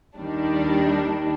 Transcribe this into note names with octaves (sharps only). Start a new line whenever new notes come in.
D#2 D#3 G3 D4